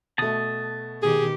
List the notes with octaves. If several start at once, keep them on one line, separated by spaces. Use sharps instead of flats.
B2 A3 A5 D#6
B2 D#3 G4 G#4